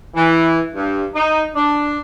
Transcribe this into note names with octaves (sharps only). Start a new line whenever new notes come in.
E3
G2
D#4
D4